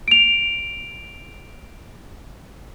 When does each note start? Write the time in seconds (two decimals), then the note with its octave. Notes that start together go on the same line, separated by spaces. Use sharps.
0.08 D7 F7